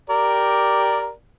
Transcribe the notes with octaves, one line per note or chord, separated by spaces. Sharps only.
G4 A#4 D5